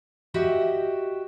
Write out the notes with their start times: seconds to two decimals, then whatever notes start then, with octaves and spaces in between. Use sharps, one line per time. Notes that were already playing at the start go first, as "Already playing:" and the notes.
0.34 F#4 G4 D#5 E5